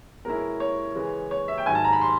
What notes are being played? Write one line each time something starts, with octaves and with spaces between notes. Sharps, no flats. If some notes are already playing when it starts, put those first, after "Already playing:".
B2 G#3 C#4 E4 A#4
C#5
C#3 E3 G#3
C#5
E5
G5
G#2 D#3 F#3 G#5
A5
A#5
B5
C6